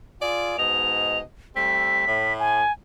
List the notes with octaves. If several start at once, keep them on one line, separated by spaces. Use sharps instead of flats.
F4 G#4 D5
G#2 B2 D#5 F7
G3 A3 C4 B6
A2
G#5